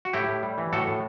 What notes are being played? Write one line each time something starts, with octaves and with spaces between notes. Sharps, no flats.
F#4
A2 E4 G4
A2
G3
E3
A2 F#4 A4
A2